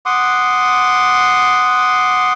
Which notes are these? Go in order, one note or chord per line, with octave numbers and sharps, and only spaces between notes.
F#5 C6 D6 D#6